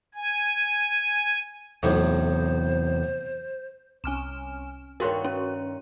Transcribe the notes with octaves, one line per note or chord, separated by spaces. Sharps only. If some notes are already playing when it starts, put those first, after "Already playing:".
G#5
B1 E2 A2 C3 C5
C2 C#4 G#5 F6 E7
G2 D#3 F#4 A#4 C#5 C6 C#6
C#4